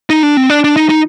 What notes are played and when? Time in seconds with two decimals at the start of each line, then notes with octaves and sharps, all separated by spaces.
0.10 D#4
0.23 D4
0.37 C4
0.50 D4
0.64 D4
0.76 D#4
0.89 D#4